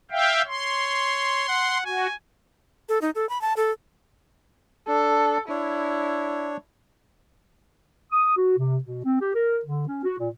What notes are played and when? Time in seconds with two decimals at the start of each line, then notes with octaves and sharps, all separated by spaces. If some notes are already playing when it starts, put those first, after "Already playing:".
0.11 E5 F5 G5
0.47 C#5 C6
1.49 F#5
1.86 F#4 G#5
2.89 A4
3.01 D#4
3.15 A4
3.29 B5
3.41 A5
3.56 A4
4.88 D4 A4
5.49 D4 E4 C#5
8.12 D#6
8.37 F#4
8.58 C3
8.84 B2
9.05 C4
9.21 G4
9.35 A#4
9.65 D3
9.88 C#4
10.04 F#4
10.19 A#2